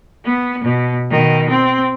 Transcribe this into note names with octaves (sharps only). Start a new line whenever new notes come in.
B3
B2
B2 D#3
C4